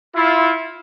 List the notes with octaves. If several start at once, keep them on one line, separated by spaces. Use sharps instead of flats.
E4 F4